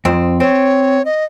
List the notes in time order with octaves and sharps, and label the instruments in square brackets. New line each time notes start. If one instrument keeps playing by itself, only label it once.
[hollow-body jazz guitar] F2 C4
[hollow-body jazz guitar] C4 [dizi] C#5
[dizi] D#5